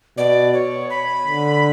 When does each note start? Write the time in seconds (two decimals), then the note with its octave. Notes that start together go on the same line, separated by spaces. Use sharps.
0.17 B2 D5
0.54 C#5
0.90 B5
1.27 D3